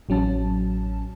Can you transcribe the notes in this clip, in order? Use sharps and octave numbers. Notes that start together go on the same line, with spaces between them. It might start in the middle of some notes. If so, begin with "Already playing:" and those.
A1 F#3 C#4 A5